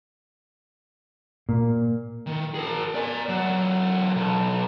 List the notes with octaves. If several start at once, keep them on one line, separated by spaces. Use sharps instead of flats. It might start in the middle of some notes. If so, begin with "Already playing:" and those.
A#2
D#3
G#4 A#4
D5 G#5
E2 F#3
B1